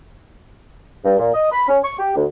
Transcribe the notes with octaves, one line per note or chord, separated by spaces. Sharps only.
G2
A#2
D#5
B5
C#4
C#6
G4
D2